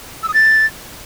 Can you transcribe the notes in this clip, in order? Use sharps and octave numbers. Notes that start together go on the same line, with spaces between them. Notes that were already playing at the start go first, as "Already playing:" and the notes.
E6
D#6
A6